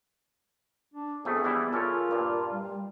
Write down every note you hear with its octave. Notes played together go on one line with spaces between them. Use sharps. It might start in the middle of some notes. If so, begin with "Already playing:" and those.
D4
F2 A3 B3 G#4
E3 G3 E4
C#3 C#4 F4 A4 A#4
G2 A#2
G3